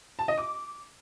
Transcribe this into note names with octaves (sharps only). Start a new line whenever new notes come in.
A5
D#5
D6